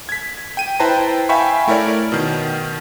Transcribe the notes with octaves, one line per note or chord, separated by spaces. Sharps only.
G#6 B6
G5 D#7
E4 B4 C5 G5 A5 A#5
E5 F5 G5 G#5 B5 C#6
A3 E4 A#4 C#5 D5
B2 D#3